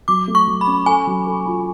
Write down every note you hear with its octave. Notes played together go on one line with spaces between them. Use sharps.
F#3 D6
A3
C#6
F#3
B5
C#4
A4 G#5
F#3
A4
F4